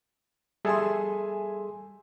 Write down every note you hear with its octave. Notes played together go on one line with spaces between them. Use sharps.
G3 G#4 A4 E5 G#5 C6